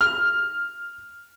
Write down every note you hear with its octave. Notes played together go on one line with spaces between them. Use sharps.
F6